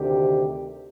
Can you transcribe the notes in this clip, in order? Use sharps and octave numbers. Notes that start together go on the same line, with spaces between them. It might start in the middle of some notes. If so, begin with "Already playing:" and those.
Already playing: D2 C3 D#3 G4